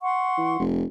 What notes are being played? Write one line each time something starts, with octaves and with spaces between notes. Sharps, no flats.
F#5 C6 C#6
E3
F1